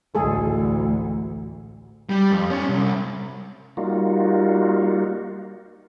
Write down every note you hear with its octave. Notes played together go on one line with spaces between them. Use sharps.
A1 D2 G#3 G#4 A4
G3
F2
C#4 D4
C2
G3 A#3 D#4 F4 F#4